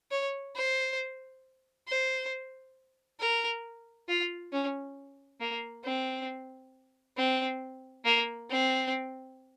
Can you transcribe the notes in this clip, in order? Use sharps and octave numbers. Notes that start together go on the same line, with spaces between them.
C#5
C5
C5
A#4
F4
C#4
A#3
C4
C4
A#3
C4